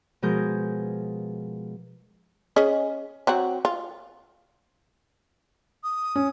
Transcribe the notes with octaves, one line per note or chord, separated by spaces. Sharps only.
B2 F3 G#3 G#4 A#4 G6
C#4 G#4 D#5
F#3 C4 F#4
F4
D#6
C#4